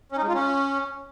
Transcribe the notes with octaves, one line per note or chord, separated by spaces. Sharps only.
C#4
D#4
G#3
F4
C#4